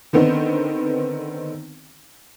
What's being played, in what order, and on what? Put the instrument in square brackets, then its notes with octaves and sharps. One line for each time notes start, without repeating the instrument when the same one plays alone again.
[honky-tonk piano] D3 D#3 B3 C4 D4 D#4